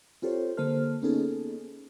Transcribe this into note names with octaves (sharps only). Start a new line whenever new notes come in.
C4 F4 G4 A4 C5 C#5
D3 A#3 A4 C5 A5 F6
A#3 B3 C#4 D#4 G#4 A4